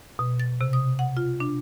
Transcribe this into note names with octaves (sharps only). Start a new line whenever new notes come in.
B2
A6
C3
D#6
F#5
F4
D4